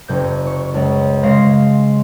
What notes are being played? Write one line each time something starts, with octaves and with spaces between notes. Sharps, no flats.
F#1 C3 G6
C#6
C#2 F#2
C#3 G#3 F5 C6 A#6